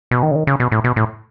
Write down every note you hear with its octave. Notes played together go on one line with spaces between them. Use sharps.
B2
D#3
C#3
D#3
C#3
B2
A2
B2
A2